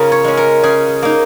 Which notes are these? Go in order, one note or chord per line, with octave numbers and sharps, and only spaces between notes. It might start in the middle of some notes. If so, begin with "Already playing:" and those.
Already playing: C#3 C#4 F4 G#4 A#4
C#5
G#3 C#4
A#4
C#3 G#4
A#3 D#4